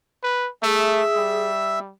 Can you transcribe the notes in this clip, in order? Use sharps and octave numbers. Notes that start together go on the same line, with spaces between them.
B4
A3 G#4 E5 E6
G3